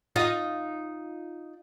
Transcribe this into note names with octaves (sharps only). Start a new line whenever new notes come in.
D#4 F4 D#5